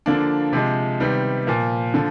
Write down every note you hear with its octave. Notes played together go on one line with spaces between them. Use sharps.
D3 F3 A#3 D4
C3 F3 G#3
C3 D#3 G3 B3
A#2 F3 A#3
D3 F3